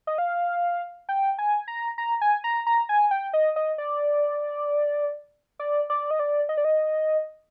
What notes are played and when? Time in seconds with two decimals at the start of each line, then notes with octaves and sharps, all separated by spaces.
0.07 D#5
0.18 F5
1.09 G5
1.39 G#5
1.68 A#5
1.98 A#5
2.21 G#5
2.44 A#5
2.67 A#5
2.89 G#5
3.11 G5
3.33 D#5
3.56 D#5
3.78 D5
5.59 D5
5.90 D5
6.11 D#5
6.19 D5
6.49 D#5
6.57 D5
6.64 D#5